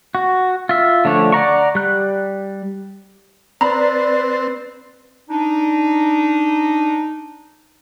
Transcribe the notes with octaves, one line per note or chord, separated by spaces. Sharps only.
F#4
F4 E5
D3 F3 A3 D4 C#5
D5 F#5 A#5 C#6
G3 F#6
C4 B4 D5 A#5 B5
D4 D#4